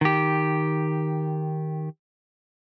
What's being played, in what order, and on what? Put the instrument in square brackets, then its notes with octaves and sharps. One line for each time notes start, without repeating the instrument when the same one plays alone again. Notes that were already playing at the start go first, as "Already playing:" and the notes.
[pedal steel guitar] D#3 G4